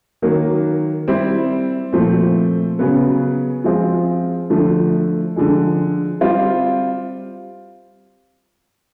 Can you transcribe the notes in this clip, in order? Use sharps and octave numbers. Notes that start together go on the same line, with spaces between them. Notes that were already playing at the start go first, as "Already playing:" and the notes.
D#3 F#3 A#3
G3 C4 E4
A#2 F3 A3 C4
C#3 F#3 B3
F3 G#3 C4 F4
D3 F3 A3
D3 F3 G#3
G3 C4 F4